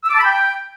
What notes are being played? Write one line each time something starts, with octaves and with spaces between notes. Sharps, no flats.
E6
D6
A5
B5
G5